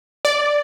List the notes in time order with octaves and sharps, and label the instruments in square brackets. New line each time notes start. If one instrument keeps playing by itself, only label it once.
[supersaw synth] D5